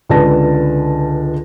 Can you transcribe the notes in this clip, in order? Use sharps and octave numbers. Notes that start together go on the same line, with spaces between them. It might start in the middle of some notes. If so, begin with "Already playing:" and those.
C#2 D3 B4 A5 A#6